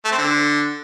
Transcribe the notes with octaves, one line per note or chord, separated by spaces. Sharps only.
A3
C4
D3